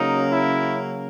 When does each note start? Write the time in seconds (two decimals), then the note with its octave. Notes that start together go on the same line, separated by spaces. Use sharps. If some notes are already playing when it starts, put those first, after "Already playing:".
Already playing: C#3 F#3 A#3 C#4 D#4
0.32 E4